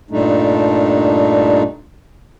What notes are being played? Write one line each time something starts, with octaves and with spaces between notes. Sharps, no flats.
G2 A#2 G3 A3 D4 D#4